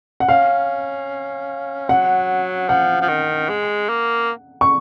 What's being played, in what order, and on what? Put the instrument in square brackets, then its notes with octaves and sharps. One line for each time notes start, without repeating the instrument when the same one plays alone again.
[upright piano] F#5
[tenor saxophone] C#4 [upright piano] F5
[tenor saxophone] F#3 [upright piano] F#5
[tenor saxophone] F3 [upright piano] F#5
[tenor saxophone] F3
D#3
G#3
A#3
[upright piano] C#6